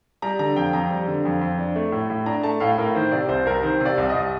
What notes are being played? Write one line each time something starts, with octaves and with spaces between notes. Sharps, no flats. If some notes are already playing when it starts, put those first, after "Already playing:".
G3 A#5
D3 A#5
F2 G5
F2 A#5
G3
D3
F2
F2
D4
A3
A2
A2
D4 A#5
A3 A5
A2 F5
A2 A#4
D#3 C5
C3 D5
C2 C5
C2 A#4
D#3 C5
C3
D5
C2
C2 D#5